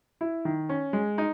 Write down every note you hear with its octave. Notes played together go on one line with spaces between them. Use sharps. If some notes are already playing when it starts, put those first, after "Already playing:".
E4
D#3
C#4
G#3
D#4